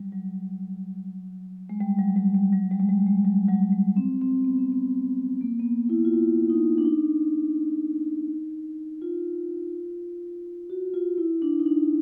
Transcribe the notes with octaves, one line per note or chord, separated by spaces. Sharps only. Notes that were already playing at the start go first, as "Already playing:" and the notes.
Already playing: F#3 G3
F#3
G#3
G3
F#3
G3
G3
F#3
G3
G#3
G3
G#3
F#3
F#3
F#3
G3
C4
C4
B3
C4
B3
A#3
B3
A#3
E4
F4
E4
D#4
D4
D#4
F4
F#4
F4
E4
D4
D#4
D4